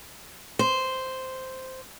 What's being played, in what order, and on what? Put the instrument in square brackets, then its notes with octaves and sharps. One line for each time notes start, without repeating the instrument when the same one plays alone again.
[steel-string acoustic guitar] C5